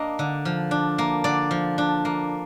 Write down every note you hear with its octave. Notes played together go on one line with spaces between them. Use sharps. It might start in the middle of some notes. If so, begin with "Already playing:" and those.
Already playing: A#3 D4 D#5
D3
F3
D4
A#3
D3 D5
F3
D4
A#3